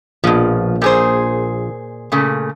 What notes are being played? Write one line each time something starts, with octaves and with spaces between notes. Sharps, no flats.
A#1 B2 F3
A#2 G#4 C5
A#2 C#3 A3